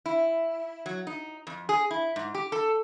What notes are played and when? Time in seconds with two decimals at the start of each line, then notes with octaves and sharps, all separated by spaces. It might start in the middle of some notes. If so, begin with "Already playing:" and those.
0.06 E4
0.86 F#3
1.07 D#4
1.47 F2
1.69 G#4
1.91 E4
2.16 G#2
2.35 G4
2.52 A4